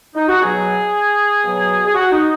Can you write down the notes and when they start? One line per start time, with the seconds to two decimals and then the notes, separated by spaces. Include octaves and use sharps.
0.15 D#4
0.28 F#4
0.40 B2 F#3 G#4
1.44 B2 F#3
1.85 G#4
1.94 F#4
2.11 D#4